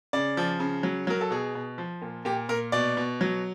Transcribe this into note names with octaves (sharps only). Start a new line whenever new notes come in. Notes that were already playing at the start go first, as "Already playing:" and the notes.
C#3 D5
F3
C#3
F#3
F#3 A#4
A4
B2 G#4
B2
F3
A#2
A#2 G4
A#2 A#4
B2 D5
B2
F#3